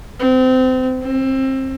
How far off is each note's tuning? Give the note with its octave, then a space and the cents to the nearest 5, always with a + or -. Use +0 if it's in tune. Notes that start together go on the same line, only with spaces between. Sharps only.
C4 -30
C4 +25